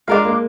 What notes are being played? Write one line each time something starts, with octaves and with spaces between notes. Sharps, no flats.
G#3 D4 F4 A#4 F5
A#3